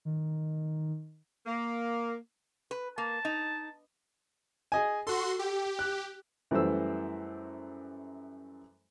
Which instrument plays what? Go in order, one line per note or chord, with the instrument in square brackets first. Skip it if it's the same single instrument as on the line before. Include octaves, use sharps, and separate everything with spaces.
[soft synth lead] D#3
[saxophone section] A#3
[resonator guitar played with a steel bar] B4
[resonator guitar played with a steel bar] A#3 [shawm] A5
[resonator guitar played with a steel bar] D#4
[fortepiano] G#4 D#5 G#5
[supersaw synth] F#4 C6 [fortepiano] A4
[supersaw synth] G4
[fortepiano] F#6
F#2 E3 G3 A3 C5 E6